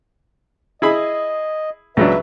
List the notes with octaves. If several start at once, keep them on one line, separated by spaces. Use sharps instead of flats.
E4 G#4 D#5 B5
C#2 F#3 D4 B4 E5